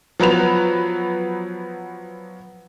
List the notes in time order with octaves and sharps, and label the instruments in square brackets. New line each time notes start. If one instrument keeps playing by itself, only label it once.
[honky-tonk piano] F3 F#3 B3 B4 F7